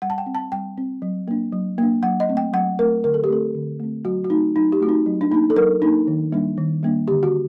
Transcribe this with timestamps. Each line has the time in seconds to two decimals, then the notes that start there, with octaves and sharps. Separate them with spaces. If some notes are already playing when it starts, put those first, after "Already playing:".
0.02 G3 F#5
0.10 A5
0.18 G5
0.26 C4
0.35 A5
0.52 G3 G5
0.78 C4
1.02 F#3
1.28 A#3 D4
1.52 F#3
1.78 A#3 D4
2.03 F#3 F#5
2.20 D#5
2.29 A3 C4
2.37 G5
2.53 F#3 F#5
2.79 A3 C4 A#4
3.04 D3 A#4
3.14 A4
3.24 G4
3.29 A3 C4 A4
3.55 D3
3.80 A3 C4
4.05 F#3 F#4
4.24 F#4
4.30 A3 C4 D#4
4.56 F#3 D#4
4.72 G4
4.80 A3 F#4
4.86 C4 D#4
5.06 F#3
5.21 D4
5.31 A#3 D4 D#4
5.50 A4
5.56 F#3 A#4
5.82 A#3 D4 D#4
6.07 D#3
6.32 G3 A#3 D4
6.58 D#3
6.83 G3 A#3 D4
7.08 D3 G4
7.23 F#4